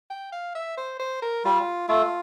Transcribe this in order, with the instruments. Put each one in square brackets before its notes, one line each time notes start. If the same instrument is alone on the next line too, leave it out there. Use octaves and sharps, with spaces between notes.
[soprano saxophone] G5
F5
E5
C5
C5
A#4
[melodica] G3 [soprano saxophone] F4
[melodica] A3 [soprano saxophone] F4